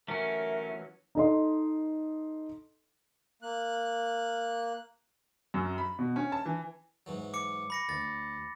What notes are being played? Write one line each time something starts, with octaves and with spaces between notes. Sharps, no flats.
E3 F#3 A3 C#4 A#4 E5
D#4 A4 D#5 C6
A#3 F#6
F#2
B5
B2
C#4
A5
E3
G#2 E3 F#3
D6 C#7
B5 A#6 C#7
D2 A6